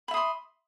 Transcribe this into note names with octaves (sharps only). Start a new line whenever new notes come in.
E5 B5 C6 D#6